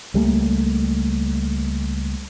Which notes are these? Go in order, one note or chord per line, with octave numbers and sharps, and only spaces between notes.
C#2 G3 A3 A#3